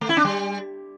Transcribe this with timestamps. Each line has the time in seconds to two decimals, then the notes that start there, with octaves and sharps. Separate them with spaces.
0.01 A3
0.09 E4
0.17 D4
0.24 G3